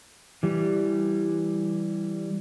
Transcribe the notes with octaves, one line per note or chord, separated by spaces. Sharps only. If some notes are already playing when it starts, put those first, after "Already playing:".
E3 G3